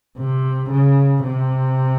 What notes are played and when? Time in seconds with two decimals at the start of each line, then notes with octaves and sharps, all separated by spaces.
0.18 C3
0.71 C#3
1.24 C3